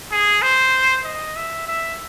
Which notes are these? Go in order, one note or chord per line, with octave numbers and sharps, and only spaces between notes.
G#4
C5
D#5
E5
E5